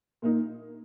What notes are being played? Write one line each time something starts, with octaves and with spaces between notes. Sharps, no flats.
A#2 A#3 D#4